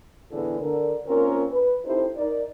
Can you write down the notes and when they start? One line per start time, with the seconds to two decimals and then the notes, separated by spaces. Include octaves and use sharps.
0.31 A2 D3 E3 B3 G#4
0.60 D3 A#4
1.07 D#2 C4 C#4 F4 A#4
1.51 B4
1.85 C4 D#4 E4 G4 A4 C5
2.16 D#4 A#4 D5